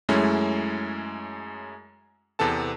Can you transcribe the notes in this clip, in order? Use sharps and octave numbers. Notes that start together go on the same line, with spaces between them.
F#2 G#3 A3 C#4 E4
E2 C3 B3 A4 A5